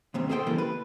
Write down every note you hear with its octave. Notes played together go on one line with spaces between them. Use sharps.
D#2 G#2 C3
G#4 A4 C5 E5 G5
C#3 E3 G3 A#3 B3 A4
B4